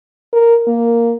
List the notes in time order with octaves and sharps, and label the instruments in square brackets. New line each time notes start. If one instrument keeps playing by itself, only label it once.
[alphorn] A#4
A#3